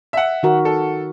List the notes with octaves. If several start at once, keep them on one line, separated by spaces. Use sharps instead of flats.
E5 F#5
D#3 F#4 A#4
A4